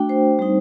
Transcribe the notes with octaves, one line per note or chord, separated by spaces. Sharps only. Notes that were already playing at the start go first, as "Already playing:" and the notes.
Already playing: A3 D4 F#4 G5
C5
G3 C4 D#4